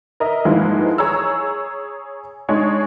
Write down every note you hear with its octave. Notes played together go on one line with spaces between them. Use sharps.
A#4 D#5 E5
G#2 E3 F3 G3 G#3 A#3
G#4 C#5 A#5 E6
G#3 D4 D#4 G#4 C#5